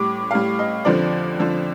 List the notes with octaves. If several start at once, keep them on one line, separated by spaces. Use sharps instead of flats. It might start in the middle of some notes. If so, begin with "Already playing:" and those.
Already playing: A2 G3 D6
A2 G3 F5
D#5
F2 D3 F3 D5
F2 D3 F3